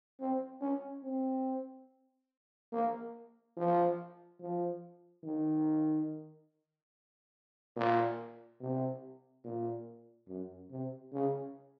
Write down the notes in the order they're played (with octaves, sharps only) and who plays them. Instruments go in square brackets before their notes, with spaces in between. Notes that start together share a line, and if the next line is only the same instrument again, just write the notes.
[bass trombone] C4
C#4
C4
A#3
F3
F3
D#3
A#2
C3
A#2
F#2
C3
C#3